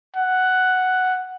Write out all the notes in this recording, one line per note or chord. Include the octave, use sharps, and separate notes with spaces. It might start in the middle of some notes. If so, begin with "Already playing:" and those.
F#5